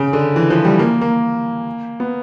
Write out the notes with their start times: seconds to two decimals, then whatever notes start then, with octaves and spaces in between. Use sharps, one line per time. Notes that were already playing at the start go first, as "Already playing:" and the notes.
Already playing: C#3
0.13 D3
0.36 E3
0.50 F3
0.65 G3
0.79 A#3
1.01 A#3
2.00 B3